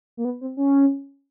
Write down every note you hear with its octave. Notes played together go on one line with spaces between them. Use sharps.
A#3
B3
C4
C#4